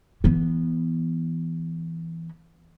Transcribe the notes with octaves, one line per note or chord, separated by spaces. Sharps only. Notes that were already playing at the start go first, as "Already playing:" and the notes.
E3 B3